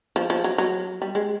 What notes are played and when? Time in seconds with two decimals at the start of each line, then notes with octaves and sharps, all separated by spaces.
0.16 F3
0.30 F3
0.44 F#3
0.58 F#3
1.02 G3
1.15 G#3